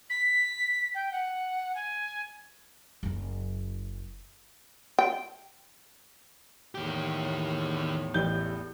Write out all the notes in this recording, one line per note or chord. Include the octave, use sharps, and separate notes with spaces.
B6
G5
F#5
G#5
F#1 F#2
G5
E2 A2 D#3 G4
A1 G4 D5 G6